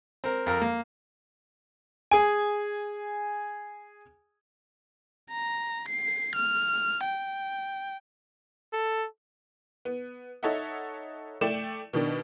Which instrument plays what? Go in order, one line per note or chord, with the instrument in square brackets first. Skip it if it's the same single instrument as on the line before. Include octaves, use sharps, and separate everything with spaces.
[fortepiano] C4 A#4
F2 A#4 F6
A#3
[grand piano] G#4 G#5
[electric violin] A#5
C7
F6
G5
[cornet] A4
[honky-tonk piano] B3
D#4 A4 C#5 D#5 E5 F#5
A3 D5 G5 E7
B2 D#3 D4